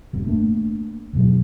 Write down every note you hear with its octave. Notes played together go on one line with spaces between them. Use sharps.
E1 G2 B3
A3 A#3 D4
E1 F#2 B2 F#3